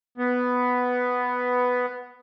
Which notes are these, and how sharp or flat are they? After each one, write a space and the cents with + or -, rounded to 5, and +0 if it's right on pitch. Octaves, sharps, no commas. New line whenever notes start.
B3 +5